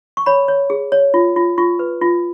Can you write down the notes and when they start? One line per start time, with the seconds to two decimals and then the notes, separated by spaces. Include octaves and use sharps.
0.17 C#6
0.26 C#5 B5
0.48 C#5
0.70 G#4
0.92 C#5
1.14 F4
1.36 F4
1.58 F4 C#6
1.79 B4
2.02 F4